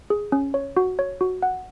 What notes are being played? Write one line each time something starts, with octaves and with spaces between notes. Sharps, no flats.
G#4
C#4
C#5
F#4
C#5
F#4
F#5